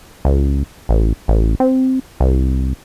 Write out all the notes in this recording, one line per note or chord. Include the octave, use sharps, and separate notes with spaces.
C#2
A1
A1
C4
C2